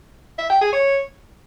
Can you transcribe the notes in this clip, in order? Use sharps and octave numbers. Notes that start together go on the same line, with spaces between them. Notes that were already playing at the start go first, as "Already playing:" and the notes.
E5
G5
G#4
C#5